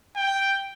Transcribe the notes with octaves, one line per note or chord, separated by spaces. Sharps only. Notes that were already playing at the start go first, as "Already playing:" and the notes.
G5